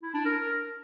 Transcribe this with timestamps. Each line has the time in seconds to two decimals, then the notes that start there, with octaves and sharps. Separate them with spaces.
0.02 E4
0.14 D4
0.25 A#4